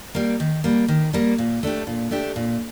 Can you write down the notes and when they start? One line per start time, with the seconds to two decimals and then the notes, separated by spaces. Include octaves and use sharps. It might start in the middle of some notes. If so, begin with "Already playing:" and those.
0.15 G3 A#3
0.40 D#3
0.64 G3 A#3
0.88 D#3
1.13 G3 A#3
1.38 A#2
1.63 A3 D4 G4
1.87 A#2
2.11 A3 D4 G4
2.36 A#2